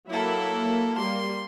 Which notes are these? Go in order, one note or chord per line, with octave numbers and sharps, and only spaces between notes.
F#3 A#3 E4 A4 E5 B5
G3 C6